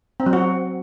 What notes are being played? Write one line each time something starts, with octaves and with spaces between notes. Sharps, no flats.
C4
F#3
F#4